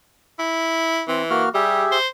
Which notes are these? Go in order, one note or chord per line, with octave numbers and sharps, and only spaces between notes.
E4
E3 C4
A#3 F#4 F6
G3 G4 G#4 E5
C5